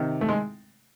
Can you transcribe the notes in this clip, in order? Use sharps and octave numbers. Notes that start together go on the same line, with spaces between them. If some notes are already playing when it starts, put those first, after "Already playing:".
Already playing: C3 D#3
A3
G#3